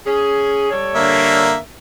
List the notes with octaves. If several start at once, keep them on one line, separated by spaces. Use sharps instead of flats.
C#4 G#4
G3 A4 C#5
D3 A#3 E5